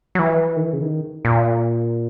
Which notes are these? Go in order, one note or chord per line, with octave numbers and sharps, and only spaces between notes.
F#3
E3
D#3
E3
C#3
D#3
A#2